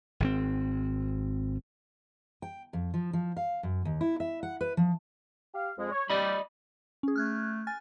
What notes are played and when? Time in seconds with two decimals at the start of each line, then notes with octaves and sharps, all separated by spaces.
0.20 G#1 C#3 C4
2.42 G5
2.73 F2
2.94 F3
3.13 F3
3.37 F5
3.63 F#2
3.85 D#2
4.01 E4
4.20 E5
4.43 F#5
4.61 B4
4.77 F3
5.54 G4 F5
5.78 F2 G#3
5.91 C#5
6.10 G3 D5 D#5 B5
7.03 C#4 G#4
7.16 A3 F6 F#6 G#6
7.67 G#5 F6 A6